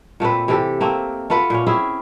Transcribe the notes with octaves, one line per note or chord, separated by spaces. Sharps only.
A#2 A3 C4 B4
C3 E3 G4 A4
A3 A#3 C4
A3 F4 B4 F#5
A#2 C#4
C4 C#4 E4 G#4